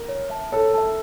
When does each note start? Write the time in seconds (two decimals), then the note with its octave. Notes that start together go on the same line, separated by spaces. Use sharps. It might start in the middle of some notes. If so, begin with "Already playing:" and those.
Already playing: A#4
0.08 C#5
0.30 E5 A5
0.52 A4 C#5
0.74 E5 A5